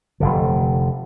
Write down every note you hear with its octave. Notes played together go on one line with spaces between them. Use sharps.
F1 A#1 D3